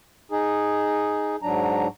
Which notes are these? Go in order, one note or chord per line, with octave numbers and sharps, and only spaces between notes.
D#4 G#4
G#2 F#3 D4 A#5